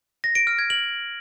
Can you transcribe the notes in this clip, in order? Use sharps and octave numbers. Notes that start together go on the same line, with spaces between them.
A#6
D7
F6
G#6
F#7